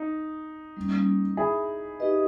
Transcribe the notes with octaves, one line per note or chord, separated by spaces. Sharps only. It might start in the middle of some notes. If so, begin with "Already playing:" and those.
Already playing: D#4
G3 A#3 C#4
E4 G#4
D#4 G4 B4 D#5